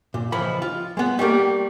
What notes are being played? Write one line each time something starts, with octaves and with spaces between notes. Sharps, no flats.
A#2
C#2 E3 F3 B5
F4
G#3 B3
G3 A3 A#3 G4